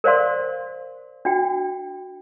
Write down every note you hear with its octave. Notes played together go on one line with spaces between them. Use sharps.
A#4 C5 D5 F5 C6
D4 F#4 G5